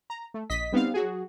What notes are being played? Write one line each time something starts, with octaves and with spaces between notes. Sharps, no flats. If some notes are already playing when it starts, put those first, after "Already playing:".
A#5
A3
A#1 D#5 B6
G3 B3 C4 D#4 F5
F#3 F#4 G#4